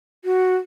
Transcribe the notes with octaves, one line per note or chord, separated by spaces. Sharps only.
F#4